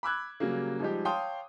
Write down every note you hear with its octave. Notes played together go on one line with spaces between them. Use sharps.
B5 D6 E6 F#6 G#6
C#3 F#3 G3 A#3
F3 G3 G#3 D#4 G4
C#5 F5 G5 A5 C6 D#6